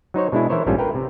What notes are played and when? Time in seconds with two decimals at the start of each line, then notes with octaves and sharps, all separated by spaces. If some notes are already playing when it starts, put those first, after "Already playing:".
0.14 F#3 D#4 C5 C#5
0.32 B2 G#3 D4 E4
0.50 E3 E4 A#4 C5 C#5
0.66 A#1 G#2 G3 C#4 F4 A4
0.78 A#4 B4 G5
0.95 C3